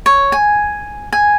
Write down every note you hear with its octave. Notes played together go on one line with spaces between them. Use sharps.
C#5
G#5
G#5